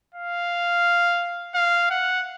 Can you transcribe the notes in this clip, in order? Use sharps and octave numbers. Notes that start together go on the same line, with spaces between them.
F5
F5
F#5